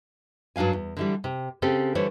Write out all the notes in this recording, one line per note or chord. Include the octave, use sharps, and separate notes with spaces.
G2 F#3 D4 F5 G#5
E2
D3 E3 G3
C3
C#3 C4 G4 A4
D3 E3 G3 C5 C#5